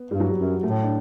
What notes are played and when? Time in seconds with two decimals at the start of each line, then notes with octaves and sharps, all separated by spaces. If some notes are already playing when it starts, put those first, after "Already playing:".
Already playing: B3
0.11 G2 G3
0.20 F#3
0.30 G3
0.38 F#2
0.63 A2 A3
0.84 D4